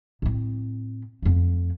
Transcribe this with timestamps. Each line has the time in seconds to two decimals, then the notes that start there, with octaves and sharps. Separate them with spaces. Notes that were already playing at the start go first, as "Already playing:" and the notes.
0.22 A2 C4
1.22 F2 A3